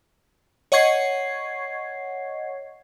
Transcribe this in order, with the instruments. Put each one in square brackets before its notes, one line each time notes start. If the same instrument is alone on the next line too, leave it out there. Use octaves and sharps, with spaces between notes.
[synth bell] C#5 D#5 F#5 C#6 G#6 C7